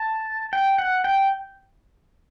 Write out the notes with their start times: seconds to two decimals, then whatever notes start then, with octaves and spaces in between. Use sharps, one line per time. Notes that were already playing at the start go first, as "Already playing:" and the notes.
Already playing: A5
0.53 G5
0.78 F#5
1.04 G5